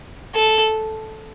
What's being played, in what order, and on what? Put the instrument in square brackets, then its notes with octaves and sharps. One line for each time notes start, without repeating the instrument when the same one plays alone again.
[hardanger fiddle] A4